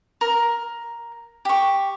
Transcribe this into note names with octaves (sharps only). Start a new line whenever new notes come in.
A#4
G4 C#6